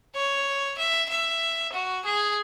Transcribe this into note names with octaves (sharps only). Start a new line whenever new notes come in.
C#5
E5
E5
F#4
G#4